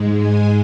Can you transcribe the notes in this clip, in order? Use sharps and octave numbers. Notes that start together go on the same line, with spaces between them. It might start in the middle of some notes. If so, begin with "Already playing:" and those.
Already playing: G#2 G#3
G#5